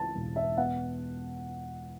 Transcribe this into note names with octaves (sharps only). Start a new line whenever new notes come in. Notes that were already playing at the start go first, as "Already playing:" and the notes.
Already playing: C#2 E3 A5
E1
E5
B3 F#5